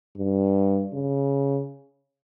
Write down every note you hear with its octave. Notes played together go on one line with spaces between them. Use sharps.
G2
C#3